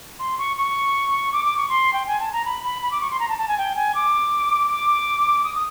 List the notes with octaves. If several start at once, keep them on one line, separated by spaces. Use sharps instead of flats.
C6
C#6
C#6
D6
D6
C#6
C6
G5
G#5
A5
A#5
B5
B5
B5
D6
C#6
C6
A#5
A5
A5
G#5
G5
G#5
D6
D6
D#6
D#6